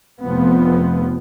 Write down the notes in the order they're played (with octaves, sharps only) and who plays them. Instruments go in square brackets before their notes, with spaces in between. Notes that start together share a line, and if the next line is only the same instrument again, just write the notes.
[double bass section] F1 F2 F3 B3